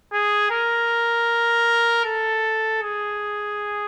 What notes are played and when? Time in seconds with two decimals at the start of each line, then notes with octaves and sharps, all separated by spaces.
0.13 G#4
0.51 A#4
2.05 A4
2.82 G#4